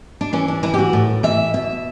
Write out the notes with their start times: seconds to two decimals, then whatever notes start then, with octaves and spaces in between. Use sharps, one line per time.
0.21 D4
0.33 E3 C#4
0.48 D4
0.63 E3 E4
0.74 G4
0.79 F#4
0.93 A2
1.23 E3 E5
1.54 B2 E5